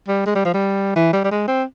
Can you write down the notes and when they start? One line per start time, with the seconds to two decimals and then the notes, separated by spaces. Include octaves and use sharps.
0.08 G3
0.26 G#3
0.35 G3
0.45 F3
0.54 G3
0.96 E3
1.13 G3
1.24 G3
1.31 G#3
1.48 C4